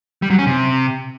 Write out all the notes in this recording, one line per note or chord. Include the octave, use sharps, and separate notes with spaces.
G3
F#3
C#4
C3